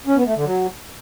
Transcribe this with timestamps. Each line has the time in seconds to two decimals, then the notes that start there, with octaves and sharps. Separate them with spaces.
0.07 C#4
0.16 B3
0.26 A3
0.35 D3
0.45 F#3